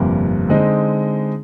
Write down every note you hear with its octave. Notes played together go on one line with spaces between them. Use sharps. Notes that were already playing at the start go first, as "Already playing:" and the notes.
Already playing: G1 F2 C3 G3 A#3
D3 G#3 C4 D#4